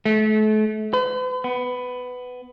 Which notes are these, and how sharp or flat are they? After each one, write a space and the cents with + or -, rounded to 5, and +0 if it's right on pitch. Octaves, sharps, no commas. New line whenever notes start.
A3 -35
B4 +45
B3 +15